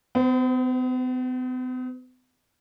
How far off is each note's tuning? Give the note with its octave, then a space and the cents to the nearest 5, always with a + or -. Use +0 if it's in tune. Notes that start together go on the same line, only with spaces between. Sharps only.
B3 +45 C5 -15